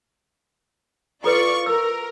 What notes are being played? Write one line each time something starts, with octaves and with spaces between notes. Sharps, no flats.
E4 F4 A4 B4 D5 C#6
A#4 E6